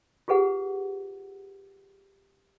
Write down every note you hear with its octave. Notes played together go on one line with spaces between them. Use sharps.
F4 G4 G#4 B4 F#5